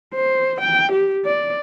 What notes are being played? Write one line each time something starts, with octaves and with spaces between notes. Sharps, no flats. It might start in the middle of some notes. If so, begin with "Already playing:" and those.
C5
G5
G4
D5